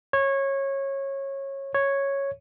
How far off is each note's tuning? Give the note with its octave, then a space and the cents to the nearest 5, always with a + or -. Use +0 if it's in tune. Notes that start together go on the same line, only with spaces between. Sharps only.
C#5 -20
C#5 -5